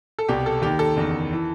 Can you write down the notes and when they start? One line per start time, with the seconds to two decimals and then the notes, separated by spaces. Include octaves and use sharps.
0.19 A4
0.28 C2 B2 G4
0.46 A4
0.62 D#2 D#3 G4
0.79 A4
0.96 F#1 E2 D#3
1.33 E3